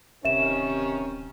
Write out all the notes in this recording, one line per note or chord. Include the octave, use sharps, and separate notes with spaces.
D1 C3 D#3 C#4 E5 E7